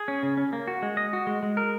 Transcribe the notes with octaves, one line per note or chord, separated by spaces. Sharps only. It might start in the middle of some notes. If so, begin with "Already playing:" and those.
Already playing: G#4
C#4
C#3
C#4
A#3
F#4
G#3
D#5
F#4
G#3
G#3
A#4